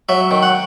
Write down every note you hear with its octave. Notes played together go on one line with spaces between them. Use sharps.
F#3 E5
D#3
F#5